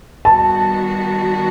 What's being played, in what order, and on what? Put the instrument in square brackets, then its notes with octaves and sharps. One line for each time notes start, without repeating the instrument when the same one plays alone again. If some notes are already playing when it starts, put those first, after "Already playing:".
[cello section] D#3 G3 B3 F#4 [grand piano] A5